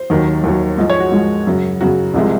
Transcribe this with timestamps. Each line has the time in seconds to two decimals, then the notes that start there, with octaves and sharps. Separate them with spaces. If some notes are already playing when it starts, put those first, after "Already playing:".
Already playing: C5
0.10 D#2 D#3 F#3
0.44 D#2 D#3 F#3
0.78 G#2 F3 G#3 D#5
0.90 C#5
1.00 F#4
1.11 G#2 F3 G#3
1.47 F#2 C#3 F#3
1.81 F#2 C#3 F#3 F#4
2.14 C2 C3 F3 G#3